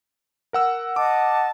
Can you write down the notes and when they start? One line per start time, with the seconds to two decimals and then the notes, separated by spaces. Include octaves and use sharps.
0.53 A#4 F#5 E6
0.96 D#5 F#5 A5 D6